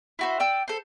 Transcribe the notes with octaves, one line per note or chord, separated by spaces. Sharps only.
E4 F#4 C5
D5 G5 E6
A4 C5